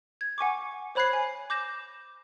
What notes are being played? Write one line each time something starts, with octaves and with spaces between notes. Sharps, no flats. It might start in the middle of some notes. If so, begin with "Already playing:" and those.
G#6
F#5 G#5 C#6 D6
C5 C#5 B5 F#6 G#6 C7
G#5
D6 G6 A#6 E7